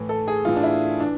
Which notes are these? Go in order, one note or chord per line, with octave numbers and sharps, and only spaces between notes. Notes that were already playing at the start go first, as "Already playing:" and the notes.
Already playing: A2 E3
A4
G#4
A2 E3 F4
D4
E4
E3 D4